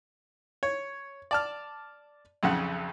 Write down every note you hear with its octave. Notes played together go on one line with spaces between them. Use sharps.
C#5
D5 A5 F6
B1 F2 C#3 F#5